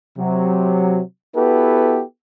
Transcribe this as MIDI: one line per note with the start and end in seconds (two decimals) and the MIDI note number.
0.18 1.01 48
0.18 1.01 54
1.36 2.02 59
1.36 2.02 64
1.36 2.02 66
1.36 2.02 67
1.36 2.02 69
1.36 2.02 71